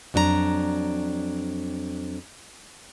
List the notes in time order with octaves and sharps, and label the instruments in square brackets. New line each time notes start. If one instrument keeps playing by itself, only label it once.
[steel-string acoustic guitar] F2 F#3 D4 F4 A#5